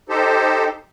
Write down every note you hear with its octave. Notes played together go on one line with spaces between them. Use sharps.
D#4 G4 A4 C5